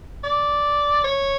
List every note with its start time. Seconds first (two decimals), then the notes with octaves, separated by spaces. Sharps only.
0.24 D5
1.04 C#5